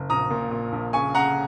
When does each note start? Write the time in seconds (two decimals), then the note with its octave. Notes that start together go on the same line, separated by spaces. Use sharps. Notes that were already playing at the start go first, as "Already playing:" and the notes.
Already playing: F#1
0.10 A#1 A#5 D#6
0.30 A#2
0.51 A#2
0.72 A#1
0.93 C#3 G#5 C#6
1.14 C#3 F#5 A#5